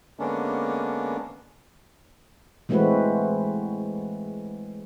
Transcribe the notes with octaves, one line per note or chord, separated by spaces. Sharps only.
D3 G#3 A#3 B3 C#4 D4
E3 G#3 A3 C4 F#4 B4